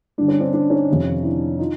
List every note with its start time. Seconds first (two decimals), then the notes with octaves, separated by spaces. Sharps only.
0.18 G2 D3 D4
0.28 C#4
0.40 C4 D4
0.54 C4 D4
0.70 C#4 D#4
0.89 F2 C3 D#3
1.23 D4 E4
1.59 D#4 F4